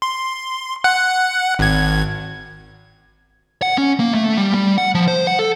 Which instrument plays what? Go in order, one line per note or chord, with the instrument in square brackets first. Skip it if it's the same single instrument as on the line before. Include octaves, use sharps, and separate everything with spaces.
[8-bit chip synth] C6
F#5 F#6
G#1 G#6
[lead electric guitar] F#5
C#4
A#3
A3
G3
G3
F#5
F3
C5
F#5
A4